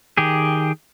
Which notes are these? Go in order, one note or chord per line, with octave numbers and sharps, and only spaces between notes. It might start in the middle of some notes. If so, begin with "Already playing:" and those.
D#3 G4 G#4